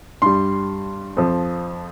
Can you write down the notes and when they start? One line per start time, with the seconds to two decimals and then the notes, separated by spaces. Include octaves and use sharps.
0.22 G2 G3 C6
1.17 F2 F3